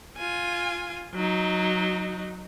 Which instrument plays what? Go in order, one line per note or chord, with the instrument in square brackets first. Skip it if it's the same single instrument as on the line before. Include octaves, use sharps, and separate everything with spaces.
[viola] F4 G#5
F#3 D#4